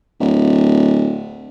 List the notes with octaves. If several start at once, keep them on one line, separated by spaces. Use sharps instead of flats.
D1